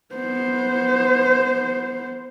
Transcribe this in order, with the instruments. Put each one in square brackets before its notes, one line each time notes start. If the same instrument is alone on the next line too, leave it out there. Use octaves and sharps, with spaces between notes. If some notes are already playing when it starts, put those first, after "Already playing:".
[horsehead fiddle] B3 C5